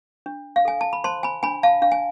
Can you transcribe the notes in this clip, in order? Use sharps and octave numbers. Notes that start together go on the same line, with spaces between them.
D4
F5
A4 G#5
A5
B5
C5 A5 C6
G#5 B5
D4 G#5 B5
F5 A5
D4 F5
G#5